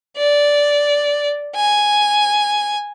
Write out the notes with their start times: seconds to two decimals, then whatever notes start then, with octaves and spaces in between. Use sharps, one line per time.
0.17 D5
1.55 G#5